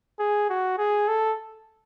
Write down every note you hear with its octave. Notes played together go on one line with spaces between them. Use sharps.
G#4
F#4
G#4
A4